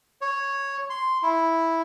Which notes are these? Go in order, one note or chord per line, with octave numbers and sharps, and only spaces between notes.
C#5
C6
E4